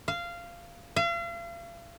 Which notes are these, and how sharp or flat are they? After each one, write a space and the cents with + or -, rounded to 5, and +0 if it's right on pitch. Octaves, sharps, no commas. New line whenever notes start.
F5 -15
F5 -40